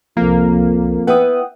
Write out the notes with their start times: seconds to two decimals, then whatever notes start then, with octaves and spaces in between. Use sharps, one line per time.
0.17 C2 F2 F3 A#3
1.07 B3 E4 B4 F#5 G5 D#6